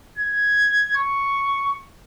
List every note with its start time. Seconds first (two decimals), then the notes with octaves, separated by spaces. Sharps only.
0.18 G#6
0.96 C#6